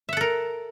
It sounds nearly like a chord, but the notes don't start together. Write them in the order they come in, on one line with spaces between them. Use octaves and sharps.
E5 F#5 A4 A#4